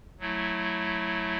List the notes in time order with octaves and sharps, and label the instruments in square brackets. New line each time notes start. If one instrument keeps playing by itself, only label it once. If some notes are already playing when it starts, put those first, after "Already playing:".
[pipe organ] F#3 A3 E4